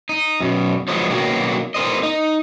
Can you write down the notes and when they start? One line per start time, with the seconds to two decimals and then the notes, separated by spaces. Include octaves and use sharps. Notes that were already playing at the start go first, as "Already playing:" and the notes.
0.09 D#4
0.40 F#2 B2
0.88 F3 F#3 G#3 B3
1.09 B2 D#3 F#3 A#3
1.75 B3 A#4 C5 D#5
2.03 D#4